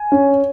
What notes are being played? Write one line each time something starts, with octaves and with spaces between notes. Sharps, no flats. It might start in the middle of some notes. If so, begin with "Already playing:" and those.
Already playing: G#5
C#4